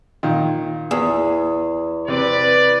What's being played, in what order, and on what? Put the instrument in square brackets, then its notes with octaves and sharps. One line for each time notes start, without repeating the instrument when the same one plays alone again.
[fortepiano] A#2 D#3
[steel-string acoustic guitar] E2 [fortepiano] G#4
[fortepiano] C3 [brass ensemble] B4 D5